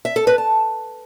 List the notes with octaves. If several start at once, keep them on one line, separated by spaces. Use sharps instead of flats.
E5
A4
B4
A5